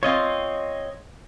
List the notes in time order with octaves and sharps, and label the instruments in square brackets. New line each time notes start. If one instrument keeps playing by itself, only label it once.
[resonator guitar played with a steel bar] C4 F4 [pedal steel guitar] C#5 D#5